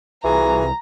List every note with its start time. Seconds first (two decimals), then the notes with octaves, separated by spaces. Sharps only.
0.24 C2 E3 F4 F#4 G#4 A#5